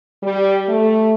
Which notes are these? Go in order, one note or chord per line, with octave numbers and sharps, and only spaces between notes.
G3
A3